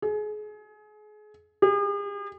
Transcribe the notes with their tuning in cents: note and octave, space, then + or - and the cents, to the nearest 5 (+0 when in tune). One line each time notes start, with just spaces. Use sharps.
G#4 +30
G#4 -45